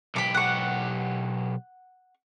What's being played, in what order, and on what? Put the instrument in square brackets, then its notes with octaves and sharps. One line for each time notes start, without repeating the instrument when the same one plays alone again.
[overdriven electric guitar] B1 G4 [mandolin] B5 D6
[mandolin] F#5 C#6